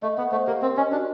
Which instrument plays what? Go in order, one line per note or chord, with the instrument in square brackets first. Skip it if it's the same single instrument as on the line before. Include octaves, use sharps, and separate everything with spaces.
[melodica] A3 [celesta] D#5
[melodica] B3 [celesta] F#5
[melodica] A3 [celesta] C5
[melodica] A#3 [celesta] G4
[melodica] C4 [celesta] A#4
[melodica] C#4 [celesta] D#5
[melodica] D4 [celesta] F#4